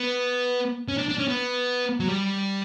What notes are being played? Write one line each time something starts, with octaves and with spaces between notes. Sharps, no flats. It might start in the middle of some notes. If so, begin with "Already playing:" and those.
Already playing: B3
C#4
D4
D4
C#4
B3
F#3
G3